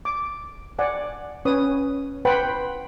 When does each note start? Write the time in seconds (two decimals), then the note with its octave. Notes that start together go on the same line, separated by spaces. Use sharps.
0.05 D6
0.79 D5 F#5 G#5
1.45 C#4 B4 C#5 D#6
2.25 B4 C5 F#5 G5 B5